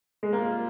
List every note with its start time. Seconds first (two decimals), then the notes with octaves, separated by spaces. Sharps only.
0.23 G#3
0.32 C3 G3 A#3 C4 F4